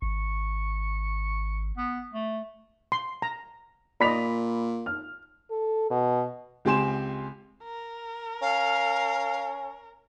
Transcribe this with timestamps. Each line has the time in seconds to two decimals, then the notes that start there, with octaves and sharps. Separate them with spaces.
0.02 G#1 C#6
1.77 B3
2.14 A3
2.92 C6
3.22 A#5
4.01 A#2 D5 D#5 B5 B6 F7
4.86 F6
5.50 A4
5.90 B2
6.65 C#2 C4 G4 G#5 C6 E7
7.64 A#4
8.42 C#4 F5